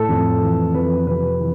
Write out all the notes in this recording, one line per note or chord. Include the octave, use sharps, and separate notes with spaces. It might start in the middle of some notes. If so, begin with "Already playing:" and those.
Already playing: A2 A4
F2
E3
F2 B4
C3 B4
E3